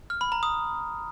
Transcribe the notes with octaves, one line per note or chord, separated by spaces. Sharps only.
F6
B5
A#5
D#6